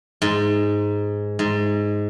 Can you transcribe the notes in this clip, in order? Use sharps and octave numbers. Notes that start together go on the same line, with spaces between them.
G#2
G#2